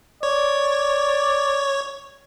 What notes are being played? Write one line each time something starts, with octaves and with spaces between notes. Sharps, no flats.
C#5 D5